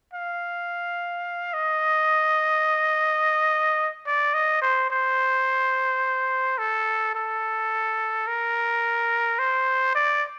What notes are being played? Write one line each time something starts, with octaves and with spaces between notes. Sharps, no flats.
F5
D#5
D5
D#5
C5
C5
A4
A4
A#4
C5
D5